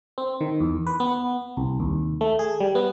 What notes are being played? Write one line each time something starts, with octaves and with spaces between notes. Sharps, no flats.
C4
D#3
E2
B4
B3
C2
D#2
A3
G#4
G3
B3